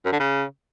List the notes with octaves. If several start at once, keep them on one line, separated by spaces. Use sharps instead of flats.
F#2
D3
C#3